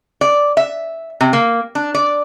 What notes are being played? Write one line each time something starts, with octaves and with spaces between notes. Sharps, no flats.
D5
E5
C3
A#3
D4
D5